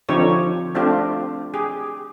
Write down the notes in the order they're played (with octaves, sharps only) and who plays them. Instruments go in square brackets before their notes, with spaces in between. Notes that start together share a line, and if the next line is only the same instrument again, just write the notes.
[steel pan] D3 F3 C4 D#4 G4 C#5
A3 C4 D4 F4 G4
G4 G#4